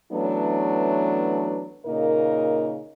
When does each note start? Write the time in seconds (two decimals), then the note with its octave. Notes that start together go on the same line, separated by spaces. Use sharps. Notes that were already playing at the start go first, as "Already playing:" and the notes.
0.12 E3 F#3 A3 B3 C#4 D4
1.86 A#2 C#3 A#3 D#4 A#4 D#5